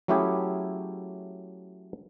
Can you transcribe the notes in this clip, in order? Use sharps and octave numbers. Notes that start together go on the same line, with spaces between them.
F#3 A3 C#4 E4 G4 G#4